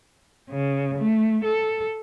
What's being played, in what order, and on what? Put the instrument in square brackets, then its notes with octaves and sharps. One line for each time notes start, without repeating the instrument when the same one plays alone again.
[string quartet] C#3
A3
A4